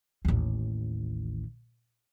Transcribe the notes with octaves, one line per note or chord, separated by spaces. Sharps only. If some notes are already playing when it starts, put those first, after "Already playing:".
A1 D#2